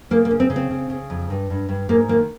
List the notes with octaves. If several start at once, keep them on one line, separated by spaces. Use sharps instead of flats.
C#3 A#3
A#3
C#3
C4
C#3
C4
C#3
C#3
F2
G2
G2
G2
G#2 A#3
D#3 A#3